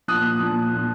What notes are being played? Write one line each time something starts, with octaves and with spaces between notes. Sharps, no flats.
A#2 F3 D#6 F#6
A#2 F3
A#2 F3